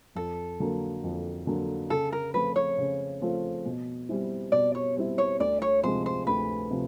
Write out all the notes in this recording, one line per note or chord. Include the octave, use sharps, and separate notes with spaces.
F2 A4
D3 F#3 A#3
F2
D3 F#3 A#3
C#3 A4
A#4
F3 A3 C4 F4 B4
C#5
C#3
F3 A3 C4 F4
B2
G3 C4 E4
B2 D5
C#5
G3 C4 E4
C#5
D2 D5
C#5
C3 F3 G#3 C4 C5
C5
D2 B4
C3 F3